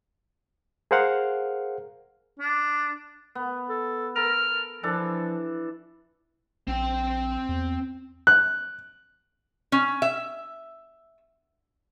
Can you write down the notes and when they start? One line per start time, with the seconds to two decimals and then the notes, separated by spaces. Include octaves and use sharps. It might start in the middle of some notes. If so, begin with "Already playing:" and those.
0.91 G#4 A#4 C5 F5 F#5 F6
2.39 D4
3.35 B3
3.69 A4
4.16 A4 A#4 F6
4.83 E3 F3 D4 A4
6.68 A#1 C4 G5
7.49 E2
8.27 F#6
9.72 C#4
10.02 E5